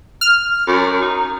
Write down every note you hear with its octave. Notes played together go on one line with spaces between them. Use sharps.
F6
F#2
D#4